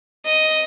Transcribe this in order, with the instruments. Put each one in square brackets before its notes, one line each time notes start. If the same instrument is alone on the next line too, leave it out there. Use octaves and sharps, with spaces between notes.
[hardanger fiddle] D#5